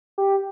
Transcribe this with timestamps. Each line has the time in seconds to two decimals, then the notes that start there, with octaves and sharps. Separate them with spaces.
0.18 G4